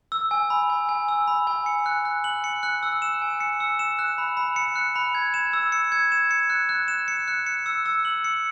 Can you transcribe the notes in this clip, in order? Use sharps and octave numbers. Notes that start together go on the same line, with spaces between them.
E6
G#5
B5
G#5
G#5
E6
B5
G#5
C#7
F#6
F#6
F#7
C#7
F#6
E6
E7
G#5
C#7
E6
E7
F#6
B5
B5
C#7
F#6
B5
G#6
E7
E6
C#7
G#6
E7
C#7
F#6
F#6
E7
C#7
F#6
C#7
E6
E6
F#7
C#7